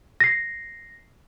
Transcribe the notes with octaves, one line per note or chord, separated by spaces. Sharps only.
A#6 C7